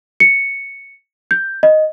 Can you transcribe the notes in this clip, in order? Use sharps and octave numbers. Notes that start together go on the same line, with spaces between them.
C#7
G6
D#5